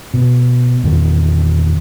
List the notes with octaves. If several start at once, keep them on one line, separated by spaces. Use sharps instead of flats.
B2
E2 A#2 D#3